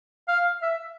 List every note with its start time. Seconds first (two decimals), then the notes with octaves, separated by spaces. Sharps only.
0.28 F5
0.62 E5